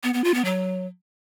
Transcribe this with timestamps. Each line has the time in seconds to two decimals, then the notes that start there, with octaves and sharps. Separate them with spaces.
0.03 B3
0.14 B3
0.24 F4
0.34 B3
0.45 F#3